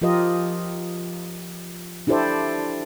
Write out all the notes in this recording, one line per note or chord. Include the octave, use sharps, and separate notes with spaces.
F3 F4 G4 A#4 D#5
D4 E4 G4 A4 C5 D5